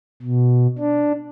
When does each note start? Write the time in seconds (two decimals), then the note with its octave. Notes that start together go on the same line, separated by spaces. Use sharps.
0.23 B2
0.79 D4